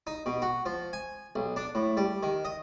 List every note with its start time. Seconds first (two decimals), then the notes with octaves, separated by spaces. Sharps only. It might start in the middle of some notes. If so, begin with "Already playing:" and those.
0.07 D#4
0.26 B2
0.42 F#4
0.66 F3
0.93 G#5
1.36 B1
1.56 D4
1.75 A2
1.97 G3
2.23 D#3
2.45 D#5